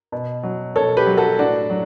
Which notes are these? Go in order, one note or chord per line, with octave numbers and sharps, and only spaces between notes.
B2
F#3
B2 A4 C#5
G4 B4
F#3
F#4 A4
A2 D4 F#4
F#3